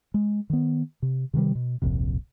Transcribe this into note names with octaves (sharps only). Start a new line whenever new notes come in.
G#3
D#3 B3
C3
C3 D#3 F3 G3
B2
D1 A#1 F2 C3